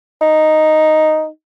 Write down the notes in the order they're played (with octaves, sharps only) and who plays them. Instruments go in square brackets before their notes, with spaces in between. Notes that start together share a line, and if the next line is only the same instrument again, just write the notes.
[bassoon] D#4